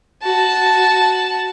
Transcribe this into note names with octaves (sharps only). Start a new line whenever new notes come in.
F#4 A5